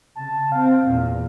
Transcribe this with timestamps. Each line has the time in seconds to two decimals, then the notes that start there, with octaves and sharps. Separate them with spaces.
0.16 C#3 A5
0.52 C4 F5
0.87 E2 A#2